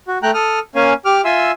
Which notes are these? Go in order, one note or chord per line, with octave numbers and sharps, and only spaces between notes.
F#4
A3 G5 A#5 F#6
A4 D#6 F6
A#3 C#4 F5 G#5
G4 D6 F6
F4 E5 G#5 C6 E6